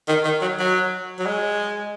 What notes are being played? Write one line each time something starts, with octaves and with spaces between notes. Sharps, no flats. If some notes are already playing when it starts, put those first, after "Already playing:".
D#3
D#3
F#3
F#3
F#3
G#3